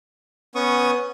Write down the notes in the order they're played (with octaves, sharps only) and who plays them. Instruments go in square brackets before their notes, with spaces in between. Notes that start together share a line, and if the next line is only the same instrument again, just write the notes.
[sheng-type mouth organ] B3 C#4 C#6 D#6